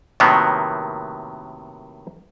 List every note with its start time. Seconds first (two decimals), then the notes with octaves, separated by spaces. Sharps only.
0.20 A2 C3 D#3 F#3 A#3 B3